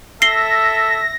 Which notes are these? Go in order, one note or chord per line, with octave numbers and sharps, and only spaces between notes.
A4 E5 A#6 C7 G7